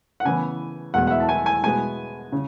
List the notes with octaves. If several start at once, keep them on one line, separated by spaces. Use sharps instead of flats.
F#5
C#3 E3 B3 G#5
E2 B2 G#3 B3 F#5
F#5
E5
A5
G#5
G#5
B2 G#3 B3 G#5
C#3